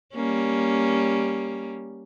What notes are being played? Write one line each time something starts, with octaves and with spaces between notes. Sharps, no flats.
G3 A#3 C#4